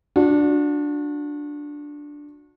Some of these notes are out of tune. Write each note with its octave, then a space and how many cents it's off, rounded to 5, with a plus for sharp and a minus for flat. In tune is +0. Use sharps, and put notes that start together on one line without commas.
D4 +0 F#4 -35